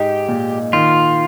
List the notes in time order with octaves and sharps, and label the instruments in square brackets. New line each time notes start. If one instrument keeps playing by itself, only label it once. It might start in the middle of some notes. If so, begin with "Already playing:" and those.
Already playing: [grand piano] G#2 D#4 [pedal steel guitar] G4
[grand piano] A#2
[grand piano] D#3 [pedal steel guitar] F4